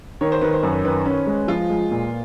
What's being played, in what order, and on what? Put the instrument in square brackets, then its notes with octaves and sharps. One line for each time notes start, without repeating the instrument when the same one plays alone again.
[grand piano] D#3 [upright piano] C#5
[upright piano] C5
[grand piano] D#3 [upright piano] B4
[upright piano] C5
[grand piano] F#2
[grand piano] D#3 [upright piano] B4
[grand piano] C#4
G#3
[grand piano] F3 [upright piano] F4
[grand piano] G#3
A#2